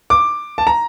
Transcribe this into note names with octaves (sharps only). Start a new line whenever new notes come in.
D6
A5
A#5